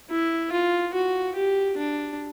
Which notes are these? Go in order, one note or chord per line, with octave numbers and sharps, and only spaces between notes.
E4
F4
F#4
G4
D4